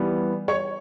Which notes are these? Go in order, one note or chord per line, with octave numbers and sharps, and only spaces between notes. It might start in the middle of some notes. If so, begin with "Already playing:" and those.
Already playing: E3 G3 B3
C#5